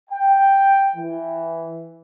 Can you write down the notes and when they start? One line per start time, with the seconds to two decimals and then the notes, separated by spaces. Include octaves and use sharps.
0.10 G5
0.96 E3